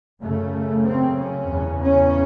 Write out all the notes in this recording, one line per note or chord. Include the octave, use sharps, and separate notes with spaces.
F#2 C#3 A3
C4
C#4
E2 C#3
C#4